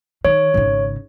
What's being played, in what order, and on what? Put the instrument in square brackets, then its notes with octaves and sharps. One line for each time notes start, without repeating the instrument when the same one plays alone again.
[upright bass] D#3 [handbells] C#5
[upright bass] G#1 C#3